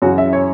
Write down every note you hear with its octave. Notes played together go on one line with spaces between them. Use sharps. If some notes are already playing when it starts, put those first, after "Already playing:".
F#2 C#3 E3 F#4
E5
C#5